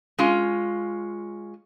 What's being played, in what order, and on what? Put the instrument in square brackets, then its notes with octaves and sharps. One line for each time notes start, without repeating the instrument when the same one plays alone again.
[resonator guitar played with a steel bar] G#3 C#4 F4